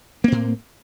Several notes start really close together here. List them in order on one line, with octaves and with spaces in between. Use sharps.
A#3 C4 A2